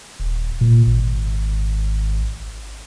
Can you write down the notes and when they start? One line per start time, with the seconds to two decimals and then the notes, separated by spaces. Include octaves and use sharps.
0.20 D#1
0.61 A#2
0.87 G#1